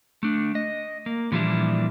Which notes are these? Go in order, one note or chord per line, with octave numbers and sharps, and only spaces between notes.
A3 D4
D#5
A#3
A#2 E3 F3 G3 D4 E4